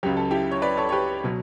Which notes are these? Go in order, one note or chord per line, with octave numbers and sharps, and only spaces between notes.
C#2 C#3 F#3 G4
A4
E4 G4
C#5
B4 D5
A4 C#5
C#5
G4 B4
B2 F#3